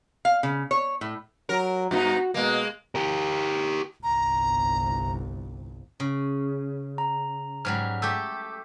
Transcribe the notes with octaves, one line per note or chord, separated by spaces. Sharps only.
F5
C#3
C#5
A2
F#3 A#4
G2 B3 D#4 F#4
B2 G#3 A#3
G4 A#4
G1 C2 A#5
C#3
A#5
G#2 F#3 G3 F6
A3 G4 E6 G6